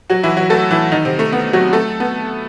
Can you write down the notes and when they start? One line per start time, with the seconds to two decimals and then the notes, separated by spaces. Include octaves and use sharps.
0.10 F#3 F#4
0.24 E3 E4
0.37 F#3 F#4
0.50 A3 A4
0.71 E3 E4
0.92 D#3 D#4
1.05 C3 C4
1.19 A3
1.32 B3
1.53 F#3 F#4
1.73 A3 A4
2.00 B3